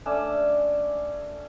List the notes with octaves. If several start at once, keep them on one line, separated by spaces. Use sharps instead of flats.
A3 C#4 D4 E6